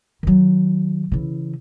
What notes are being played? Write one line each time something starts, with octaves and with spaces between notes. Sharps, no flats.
D#3 F#3
C#3 E3